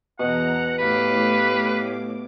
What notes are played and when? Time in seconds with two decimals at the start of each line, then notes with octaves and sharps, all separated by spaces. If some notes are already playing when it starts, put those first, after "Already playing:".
0.19 E2 B2 F#5 A#5
0.79 A2 G4 B4 F5 D6